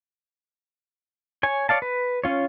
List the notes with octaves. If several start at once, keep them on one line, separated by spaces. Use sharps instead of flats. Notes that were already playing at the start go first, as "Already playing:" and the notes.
C#5 G#5
C#5 D5 F5 A5
B4
C#4 F4 C#5